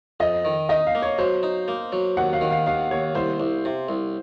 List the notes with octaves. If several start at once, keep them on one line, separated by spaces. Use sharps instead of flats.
F2 D#5
D#3
D#4 D#5
F5
A#3
C#5
F#3 C5
D#4
A#3
F#3
D#2 F#5
F5
D#3
F5
D#2 F5
D#2 C#5
C2 C5
C2
C3
C2